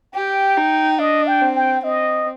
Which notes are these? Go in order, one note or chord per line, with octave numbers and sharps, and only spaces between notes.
G4 G5
D#4
D4 D#5
G5
C4
G5
C4 D#5